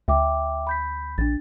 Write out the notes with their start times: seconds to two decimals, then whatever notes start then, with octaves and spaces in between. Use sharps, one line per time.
0.08 D2 E5 G5 D6
0.67 B5 G6 B6
1.18 A#1 D4 A6